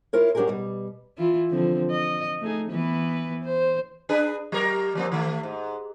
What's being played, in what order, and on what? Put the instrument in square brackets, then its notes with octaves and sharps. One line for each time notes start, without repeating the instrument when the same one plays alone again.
[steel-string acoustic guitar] E4 F4 A#4 C#5
F#3 C#4 D4 G4 G#4 A#4
B2 G3
[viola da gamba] E3 E4 F4
D3 F3 C4
D#5
A3 D#4 G#4
E3 B3 B4
C5
[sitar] D4 G#4 B4
F#3 G4 A#4
F3 A#3 C4
D#3 A3
G#2